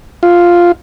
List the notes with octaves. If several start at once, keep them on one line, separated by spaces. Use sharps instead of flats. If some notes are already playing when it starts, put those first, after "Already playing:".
F4